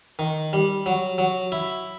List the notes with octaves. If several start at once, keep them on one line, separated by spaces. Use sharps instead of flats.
D#3
G3
F#3
F#3
E4